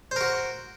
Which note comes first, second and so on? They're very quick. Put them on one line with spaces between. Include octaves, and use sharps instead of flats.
C5 A#4 F#4